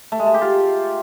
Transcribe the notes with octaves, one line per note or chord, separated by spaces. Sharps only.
A3
G#3
A3
G4
F4